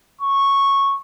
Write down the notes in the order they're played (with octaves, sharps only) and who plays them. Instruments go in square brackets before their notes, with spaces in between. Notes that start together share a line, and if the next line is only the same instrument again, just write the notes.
[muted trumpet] C#6